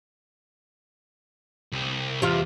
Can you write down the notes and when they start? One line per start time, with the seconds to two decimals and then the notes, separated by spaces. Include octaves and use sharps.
1.72 C2
2.22 E2 C3 F4